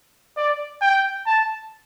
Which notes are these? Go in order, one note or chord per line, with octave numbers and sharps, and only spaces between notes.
D5
G5
A5